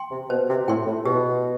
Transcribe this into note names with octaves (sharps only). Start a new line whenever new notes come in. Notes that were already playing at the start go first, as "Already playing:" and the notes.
Already playing: G5 C6
C3
B2 C5
C3
A2 G5 C6
A2
B2 G4